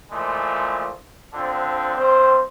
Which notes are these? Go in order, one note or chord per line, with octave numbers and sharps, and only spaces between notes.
A#2 E3 F3 G#3 A3
D3 F3 C4 D4
G2 C4 C5